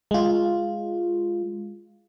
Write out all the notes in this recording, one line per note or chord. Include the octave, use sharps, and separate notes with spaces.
G#3 F4